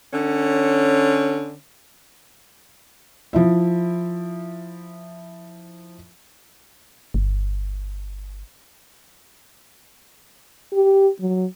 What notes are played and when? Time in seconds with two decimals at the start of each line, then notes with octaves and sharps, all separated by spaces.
0.13 D3 C#4
3.33 F3 E4 E5
7.14 G1
10.73 G4
11.20 F#3